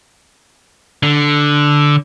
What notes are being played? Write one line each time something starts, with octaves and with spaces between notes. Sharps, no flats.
D3